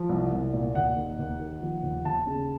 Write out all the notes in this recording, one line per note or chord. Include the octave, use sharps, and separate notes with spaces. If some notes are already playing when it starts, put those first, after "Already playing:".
Already playing: F3
C2
C2
A#2
D#2 F#5
D#3
D#2
D#3
F3
D#2
D#2 A5
C#3